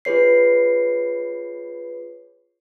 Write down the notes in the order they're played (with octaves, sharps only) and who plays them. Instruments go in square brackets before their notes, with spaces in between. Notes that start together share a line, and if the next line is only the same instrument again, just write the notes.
[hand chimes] F4 G#4 B4 C#5 C7